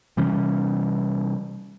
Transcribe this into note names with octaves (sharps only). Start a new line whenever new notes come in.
C3 E3 G3 C#4